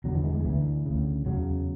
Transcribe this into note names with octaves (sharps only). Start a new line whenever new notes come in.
E2 D3 F#3
E3
G#3
G#3
D2 D3 E3
D2 C#3
E2 C#3 F#3